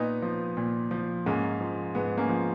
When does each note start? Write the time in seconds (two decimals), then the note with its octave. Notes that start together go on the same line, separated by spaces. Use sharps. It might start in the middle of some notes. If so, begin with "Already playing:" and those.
Already playing: A#2 B3 D#4
0.22 F3
0.57 A#2
0.91 F3
1.26 G#2 A#3 C#4
1.60 F3
1.95 G#2 B3
2.18 A#3 C#4
2.29 F3